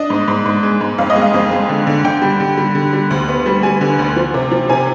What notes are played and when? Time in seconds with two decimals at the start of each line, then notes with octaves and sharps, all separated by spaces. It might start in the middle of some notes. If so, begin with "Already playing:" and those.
Already playing: D4 D#5
0.10 G#2
0.28 G#2
0.46 G#2
0.63 G#3
0.81 G#2
0.98 F2 F5
1.10 D#5
1.16 G#3
1.22 F5
1.34 F2
1.51 G#3
1.69 D3
1.87 D3
2.04 D3 G5
2.22 G3
2.40 D3
2.58 G3
2.75 D3
2.93 G3
3.11 D2
3.28 B3
3.46 G3
3.63 G3 G#5
3.81 D3
3.99 D2
4.16 F3
4.34 C3
4.52 F3
4.69 C3 G#5